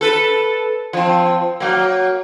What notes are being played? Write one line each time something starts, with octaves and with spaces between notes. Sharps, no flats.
A4 B4
F3 C4
F#3 A#3